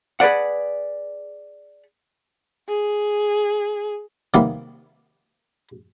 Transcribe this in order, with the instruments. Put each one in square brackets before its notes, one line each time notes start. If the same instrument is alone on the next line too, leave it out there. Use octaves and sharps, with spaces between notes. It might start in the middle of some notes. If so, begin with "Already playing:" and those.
[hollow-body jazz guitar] G#4 B4 C5 D5 F#5
[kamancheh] G#4
[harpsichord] C3 D#3 G3 A#3 B3